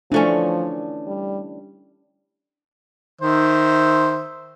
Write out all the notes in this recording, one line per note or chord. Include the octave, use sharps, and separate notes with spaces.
E3 F3 A3 C#4 D4
G3
D#3 C5 E5